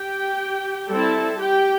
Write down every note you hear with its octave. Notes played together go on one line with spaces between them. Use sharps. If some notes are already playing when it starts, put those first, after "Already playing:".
Already playing: G4 G5
G3 C4 E4 A4 A5
G4 G5